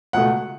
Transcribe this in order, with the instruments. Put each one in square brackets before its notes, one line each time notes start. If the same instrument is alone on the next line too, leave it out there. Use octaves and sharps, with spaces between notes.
[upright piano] C#2 B2 A3 F#5